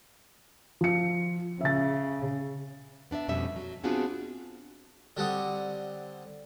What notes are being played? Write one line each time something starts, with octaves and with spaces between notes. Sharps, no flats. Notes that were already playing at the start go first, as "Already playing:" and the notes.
F3 C#7
C#3 E5 A6
B3 D4 D5 E5
F2 B2 F#3 G3 C#4 E5
F#3
B3 C4 D4 F4 F#4 G#4
D3 G3 C4 F#5 D#6